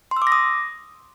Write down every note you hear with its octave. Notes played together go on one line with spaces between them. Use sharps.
C6
E6
D6
A#6
D#6